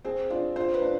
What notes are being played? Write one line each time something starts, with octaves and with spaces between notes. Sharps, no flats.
C4 G#4
D4 F4
F4 C5
B4
D4